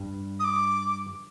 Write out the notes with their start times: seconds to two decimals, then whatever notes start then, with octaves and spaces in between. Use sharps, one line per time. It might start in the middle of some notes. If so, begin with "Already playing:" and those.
Already playing: G2
0.40 D#6
0.44 D6